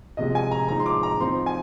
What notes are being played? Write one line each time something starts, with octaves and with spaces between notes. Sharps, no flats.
C3 F3 G#3 D#5
G#5
A#5
F3 G#3 D#4 A#5
C6
D6
A#5
F3 C4 D#4 C6
G#5